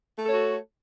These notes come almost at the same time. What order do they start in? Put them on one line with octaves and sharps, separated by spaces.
A3 A4 C#5 F#4